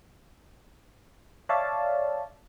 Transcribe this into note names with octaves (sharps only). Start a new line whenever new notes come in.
C#5 D5 E5 F5 A5